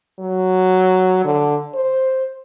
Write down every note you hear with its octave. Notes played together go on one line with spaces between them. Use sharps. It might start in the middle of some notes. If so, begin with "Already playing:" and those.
F#3
D3
C5